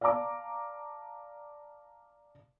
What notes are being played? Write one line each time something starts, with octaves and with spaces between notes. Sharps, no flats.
D5 F5 A5 A#5 D6